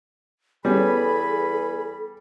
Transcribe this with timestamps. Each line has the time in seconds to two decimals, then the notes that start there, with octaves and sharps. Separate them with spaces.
0.65 E2 G3 B3 G#4 A4 C#5 G#5 B5